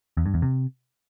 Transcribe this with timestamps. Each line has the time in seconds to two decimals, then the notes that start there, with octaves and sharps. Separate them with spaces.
0.17 E2
0.26 G2
0.34 E2
0.42 C3